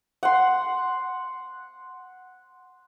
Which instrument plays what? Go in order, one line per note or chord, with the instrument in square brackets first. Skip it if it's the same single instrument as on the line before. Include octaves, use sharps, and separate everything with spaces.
[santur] F#5 C6